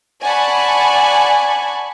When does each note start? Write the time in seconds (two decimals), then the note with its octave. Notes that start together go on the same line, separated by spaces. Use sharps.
0.23 D5 F#5 G#5 A5 B5 C#6